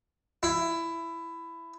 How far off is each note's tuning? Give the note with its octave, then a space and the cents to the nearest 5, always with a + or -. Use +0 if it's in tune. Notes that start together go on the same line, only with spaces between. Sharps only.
E4 +15